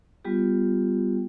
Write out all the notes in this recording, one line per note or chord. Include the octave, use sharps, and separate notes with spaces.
G3 B3 F4 G4